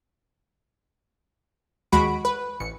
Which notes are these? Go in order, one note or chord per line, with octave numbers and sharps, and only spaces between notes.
D#2 G#3 F#4 B5 D7
B4
A1 C#7